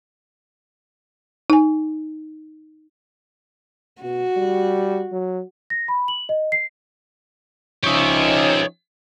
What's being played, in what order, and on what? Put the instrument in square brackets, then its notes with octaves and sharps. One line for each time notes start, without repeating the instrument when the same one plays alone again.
[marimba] D#4 G#5
[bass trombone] B2 [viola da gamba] F#4
[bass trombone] G3
F#3
[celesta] A#6
B5
F#7
D#5
C7
[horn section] F3 C#4 D#4 [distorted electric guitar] G4 E5 [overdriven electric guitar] C#5 D#5